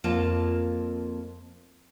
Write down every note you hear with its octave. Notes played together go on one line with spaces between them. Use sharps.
F2 A#3 F4 A5